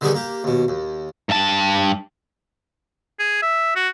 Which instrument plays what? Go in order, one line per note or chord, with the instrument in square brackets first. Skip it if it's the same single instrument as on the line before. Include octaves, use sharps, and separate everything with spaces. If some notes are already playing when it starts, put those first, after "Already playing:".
[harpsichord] D3 D#3 G3 B3 G4 G#4
A#3 G4
D#2 B2
D#2
[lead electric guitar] G2 A5
[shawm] G#4
E5
F#4